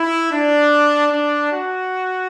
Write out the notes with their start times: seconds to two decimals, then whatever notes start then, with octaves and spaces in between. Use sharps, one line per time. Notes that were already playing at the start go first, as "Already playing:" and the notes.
Already playing: E4
0.32 D4
1.11 D4
1.50 F#4